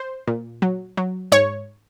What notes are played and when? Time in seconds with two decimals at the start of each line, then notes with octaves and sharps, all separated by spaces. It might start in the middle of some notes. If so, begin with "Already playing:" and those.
Already playing: C5
0.27 A#2
0.62 F#3
0.97 F#3
1.32 G#2 C#5